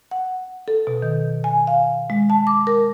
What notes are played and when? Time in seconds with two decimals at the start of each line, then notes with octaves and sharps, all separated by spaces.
0.11 F#5
0.68 A4
0.87 B2
1.02 D#3
1.44 G#5
1.67 F5
2.10 G#3
2.30 A5
2.47 D6
2.67 A#4